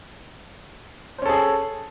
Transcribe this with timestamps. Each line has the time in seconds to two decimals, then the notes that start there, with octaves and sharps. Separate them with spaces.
1.18 C5
1.22 C#4
1.26 A4
1.29 G#4